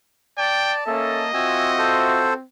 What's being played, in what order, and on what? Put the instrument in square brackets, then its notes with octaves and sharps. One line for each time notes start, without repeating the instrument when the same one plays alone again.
[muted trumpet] D5 [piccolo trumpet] G5 [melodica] A5
[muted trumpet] A#3 [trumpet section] C#4 A4 E5 [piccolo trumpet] D#5
[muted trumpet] C4 [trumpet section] F4 F#4 E5 [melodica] G#5 E6
[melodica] A4 C5